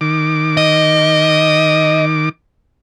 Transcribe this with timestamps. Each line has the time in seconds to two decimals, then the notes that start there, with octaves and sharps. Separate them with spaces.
0.01 D#3 D6
0.57 D#5